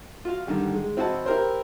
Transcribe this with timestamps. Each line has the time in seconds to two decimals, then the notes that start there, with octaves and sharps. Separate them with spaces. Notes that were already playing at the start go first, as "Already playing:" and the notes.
0.25 F4 F#4 F5
0.47 G2 D3 D#3 G3
0.74 G#3
0.97 C4 E4 F#4 D#5 F#5 A5
1.26 E4 G4 A#4 C5